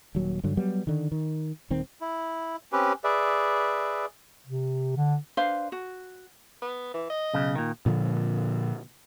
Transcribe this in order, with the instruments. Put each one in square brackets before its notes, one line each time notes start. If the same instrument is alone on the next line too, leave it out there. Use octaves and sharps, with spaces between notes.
[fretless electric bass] D#1 D#2 F#3
G2 D3 F#3
F#3 G3 B3
D3 D#3
D#3
D#1 D#3 C4
[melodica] E4
C4 C#4 G4 B4
G#4 B4 D5 E5
[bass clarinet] C3
D3
[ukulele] D4 B4 C5 F5
F#4
[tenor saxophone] B3
E3
D#5
[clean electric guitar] B1 C#3
A#2 D#3
[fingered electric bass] A#2 D3 F3